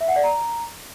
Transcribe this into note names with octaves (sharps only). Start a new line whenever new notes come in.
E5
F#5
D5
A#5